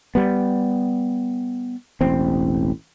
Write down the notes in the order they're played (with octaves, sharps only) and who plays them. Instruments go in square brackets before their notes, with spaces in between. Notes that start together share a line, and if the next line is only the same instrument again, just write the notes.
[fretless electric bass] G3 B3
E1 A1 C4